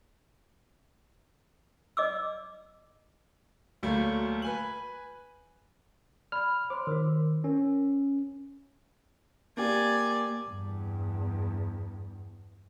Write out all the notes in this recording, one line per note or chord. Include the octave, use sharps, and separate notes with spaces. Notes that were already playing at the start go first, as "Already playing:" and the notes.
D5 D#5 D6 E6
D2 F#3 G3 A3 A#3
B4 G#5 F#7
D5 B5 F6
C5 C#5 C6 D6
D#3 F#4 A#4
C#4 A#4
A#3 G4 D5 G#5
E2 G2